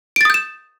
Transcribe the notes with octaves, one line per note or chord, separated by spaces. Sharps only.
D#6 G6 A6 D7 E7